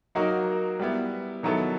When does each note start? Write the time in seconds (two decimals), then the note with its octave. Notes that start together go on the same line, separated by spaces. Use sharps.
0.15 F#3 A#3 D#4 F#4 A#4
0.80 G3 B3 E4
1.43 D#3 F#3 B3 E4 A4